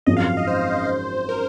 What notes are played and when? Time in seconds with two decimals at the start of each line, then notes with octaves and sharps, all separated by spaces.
0.07 G#1 F#2 F3 G#3 C4 D#5
0.17 F5
0.27 F5
0.37 D#5
0.47 C5
1.29 A#4